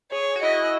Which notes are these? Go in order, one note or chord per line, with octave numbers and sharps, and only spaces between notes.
G#4 C#5
F#4
E4 D#5